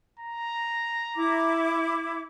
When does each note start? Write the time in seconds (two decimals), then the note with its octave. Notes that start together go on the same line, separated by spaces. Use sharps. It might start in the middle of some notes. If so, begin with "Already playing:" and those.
0.20 A#5
1.17 E4 D6